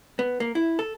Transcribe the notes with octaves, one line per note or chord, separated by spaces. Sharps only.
B3
A#3
E4
A4